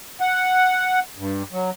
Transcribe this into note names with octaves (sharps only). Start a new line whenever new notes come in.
F#5
G2
F#3